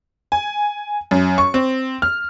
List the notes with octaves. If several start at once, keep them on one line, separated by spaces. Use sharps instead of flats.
G#5
F#2
C#6
C4
F6